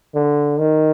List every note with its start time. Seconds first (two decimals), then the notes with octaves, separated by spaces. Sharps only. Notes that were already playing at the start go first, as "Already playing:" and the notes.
0.15 D3
0.59 D#3